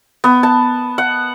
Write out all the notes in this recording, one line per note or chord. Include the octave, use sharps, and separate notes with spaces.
B3
A5
F#5